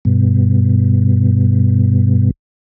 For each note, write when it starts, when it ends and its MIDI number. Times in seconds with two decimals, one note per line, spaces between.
0.05 2.31 43
0.05 2.31 47